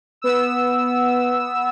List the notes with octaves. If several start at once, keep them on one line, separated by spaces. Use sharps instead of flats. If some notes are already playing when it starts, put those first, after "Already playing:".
B3 E6